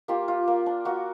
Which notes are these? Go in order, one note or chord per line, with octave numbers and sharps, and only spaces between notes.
A#3 F4 G4
F4
A#3
D4
A#3 F#4